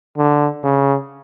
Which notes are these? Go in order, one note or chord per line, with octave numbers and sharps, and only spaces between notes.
D3
C#3